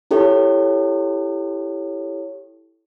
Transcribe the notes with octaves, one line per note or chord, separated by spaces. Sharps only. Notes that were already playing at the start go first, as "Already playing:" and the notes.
E4 G4 A4 C#5